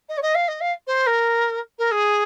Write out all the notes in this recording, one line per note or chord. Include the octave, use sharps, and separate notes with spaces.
D#5
C#5
D#5
F5
D#5
F5
C5
A#4
A#4
G#4